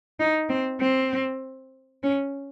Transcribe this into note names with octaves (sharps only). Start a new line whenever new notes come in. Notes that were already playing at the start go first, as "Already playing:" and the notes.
D#4
C4
C4
C#4